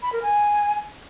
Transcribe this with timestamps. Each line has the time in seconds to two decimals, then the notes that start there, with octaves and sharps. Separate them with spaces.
0.02 B5
0.13 A#4
0.23 G#5